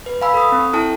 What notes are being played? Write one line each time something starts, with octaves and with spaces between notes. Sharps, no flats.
B4
F5 G#5 B5 E6
A4 D#6
C4
E4 A4 G5 A5